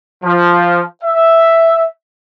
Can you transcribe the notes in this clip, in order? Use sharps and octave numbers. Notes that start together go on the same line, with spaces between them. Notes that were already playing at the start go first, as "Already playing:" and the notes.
F3
E5